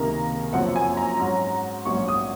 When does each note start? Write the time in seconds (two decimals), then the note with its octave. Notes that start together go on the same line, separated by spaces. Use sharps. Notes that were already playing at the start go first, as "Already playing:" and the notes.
Already playing: C#2 C3 D#3 A#3 A#5
0.53 F#1 F#2 F3 C4 F#5
0.76 G#5
0.97 A#5
1.19 G#2 F#3 C#4
1.85 A#1 G#2 F#3 C#4 C#6
2.08 D#6